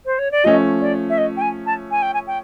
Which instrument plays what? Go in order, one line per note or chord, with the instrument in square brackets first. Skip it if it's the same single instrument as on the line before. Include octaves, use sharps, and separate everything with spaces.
[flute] C5
C#5
D5
[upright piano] F3 A3 C#4 [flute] D#5
[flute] D5
E5
D#5
G5
G#5
A5
G#5
G5
G#5
G5